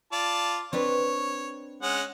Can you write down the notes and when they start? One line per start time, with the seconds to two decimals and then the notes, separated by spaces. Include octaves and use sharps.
0.12 F4 D5 A5
0.73 C4 D4 B4 C#5
1.82 G#3 C#4 F#5